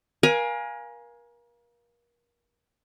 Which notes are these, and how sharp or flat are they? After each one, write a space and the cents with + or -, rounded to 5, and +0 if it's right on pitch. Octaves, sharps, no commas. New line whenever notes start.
A#4 +35 F5 +0 G#5 +0